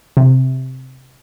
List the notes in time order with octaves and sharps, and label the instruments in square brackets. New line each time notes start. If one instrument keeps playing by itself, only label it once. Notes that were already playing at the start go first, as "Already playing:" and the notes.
[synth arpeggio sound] C3